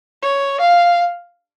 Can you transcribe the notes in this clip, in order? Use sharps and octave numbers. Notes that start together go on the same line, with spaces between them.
C#5
F5